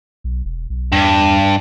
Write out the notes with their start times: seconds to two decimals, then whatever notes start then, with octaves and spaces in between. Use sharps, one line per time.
0.24 B1
0.45 E1
0.70 B1
0.93 E2 G2